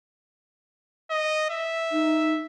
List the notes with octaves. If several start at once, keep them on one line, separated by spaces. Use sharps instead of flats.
D#5
E5
D#4